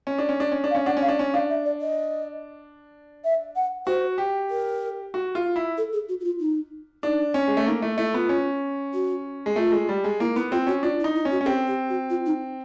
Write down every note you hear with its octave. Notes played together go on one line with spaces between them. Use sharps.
C#4
D4
C#4
D4
C#4
D4
F5
C#4
D4 F#5
C#4
F5
D4
C#4
D4 F5
E5
D5
D#5
E5
F#5
F#4 C5
G4
A#4
F#4
F4
E4
A4
G#4
F#4
F#4
F4
D#4
D4 D#4
C#4
G#3
A3
A#3 D#4
A3 E4
A3 E4
B3 F4
C#4
F#4
G#3
A3 F4
G#3
G3
G#3
A#3 E4
B3 E4
C4 F4
C#4 F#4
D4 F4
E4
D#4
E4
C#4
F#4
C#4
C4 G4
G4
F#4
F4
D#4